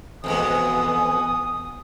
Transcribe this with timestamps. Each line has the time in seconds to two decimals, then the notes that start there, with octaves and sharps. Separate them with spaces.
0.24 F2 B2 E3 G#3 B3 G#5 D#6